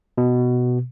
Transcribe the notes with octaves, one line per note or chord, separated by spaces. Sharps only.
B2